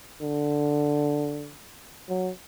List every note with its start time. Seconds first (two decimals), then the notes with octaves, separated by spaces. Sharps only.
0.22 D3
2.09 F#3